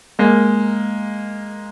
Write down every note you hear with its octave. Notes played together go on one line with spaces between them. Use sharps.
G#3 A#3